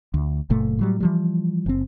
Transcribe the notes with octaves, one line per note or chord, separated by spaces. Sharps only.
D2
F#1 A#2 A3
A2 F#3 G3
E3 F3 G3
F#1 C4